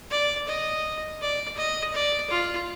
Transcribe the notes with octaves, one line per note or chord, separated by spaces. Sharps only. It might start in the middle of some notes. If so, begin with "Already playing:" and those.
D5
D#5
D5
D#5
D5
F4